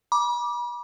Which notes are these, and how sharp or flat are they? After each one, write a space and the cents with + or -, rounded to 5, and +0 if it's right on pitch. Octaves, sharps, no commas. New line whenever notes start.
B5 -40 D6 +0